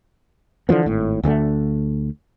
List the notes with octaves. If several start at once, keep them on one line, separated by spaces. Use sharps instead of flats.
D3 E3 F3 B3
G#1 A2
D2 D3 D#3 A3